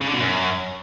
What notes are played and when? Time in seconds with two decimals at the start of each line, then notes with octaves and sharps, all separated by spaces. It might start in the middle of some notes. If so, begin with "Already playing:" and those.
0.01 C#3
0.07 D3
0.14 B2
0.20 F#2